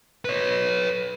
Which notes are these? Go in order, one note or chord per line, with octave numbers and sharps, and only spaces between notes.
B4 C#5